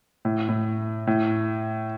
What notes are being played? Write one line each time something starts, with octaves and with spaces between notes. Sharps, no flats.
A2
A2
A2